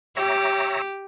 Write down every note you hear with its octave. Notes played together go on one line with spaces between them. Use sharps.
G4 C#5 E5 A#5